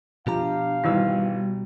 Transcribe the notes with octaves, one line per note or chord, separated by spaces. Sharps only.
B2 F3 D4 G4 F5 A#5
G#1 E3 G3 F#4 E6